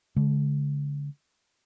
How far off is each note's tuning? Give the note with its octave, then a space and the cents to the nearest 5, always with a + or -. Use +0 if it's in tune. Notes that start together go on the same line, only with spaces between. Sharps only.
D3 -35 G#3 +30